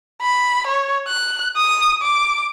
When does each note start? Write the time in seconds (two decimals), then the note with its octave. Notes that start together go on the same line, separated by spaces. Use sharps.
0.22 B5
0.67 C#5
1.08 F#6
1.57 D#6
2.02 D6